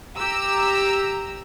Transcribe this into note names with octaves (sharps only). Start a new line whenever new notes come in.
G4 A#5 E6